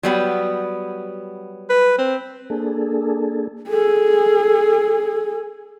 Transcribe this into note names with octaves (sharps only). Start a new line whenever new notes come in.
F#3 G3 B3
B4
C4
A#3 D4 G#4 A4
G#4 A4